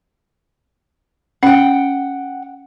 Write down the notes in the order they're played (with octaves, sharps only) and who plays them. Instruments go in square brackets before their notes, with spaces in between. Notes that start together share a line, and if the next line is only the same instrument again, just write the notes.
[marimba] C#4 [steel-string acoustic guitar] F#5 G5